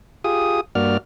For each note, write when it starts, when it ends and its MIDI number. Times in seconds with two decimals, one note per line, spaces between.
0.24 0.61 65
0.24 0.61 67
0.24 0.61 68
0.24 0.61 87
0.75 0.97 43
0.75 0.97 58
0.75 0.97 66
0.75 0.97 74
0.75 0.97 89